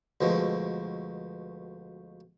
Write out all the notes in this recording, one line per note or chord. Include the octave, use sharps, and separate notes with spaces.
D2 B2 F3 G#3